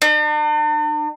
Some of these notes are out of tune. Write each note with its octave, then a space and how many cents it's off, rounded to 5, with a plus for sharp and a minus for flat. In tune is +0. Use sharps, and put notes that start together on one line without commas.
D4 +45